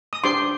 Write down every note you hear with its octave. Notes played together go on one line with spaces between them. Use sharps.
D#6
D4 G4 C5 C6 D6